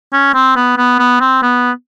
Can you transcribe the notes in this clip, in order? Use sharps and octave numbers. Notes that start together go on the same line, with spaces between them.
C#4
C4
B3
B3
B3
C4
B3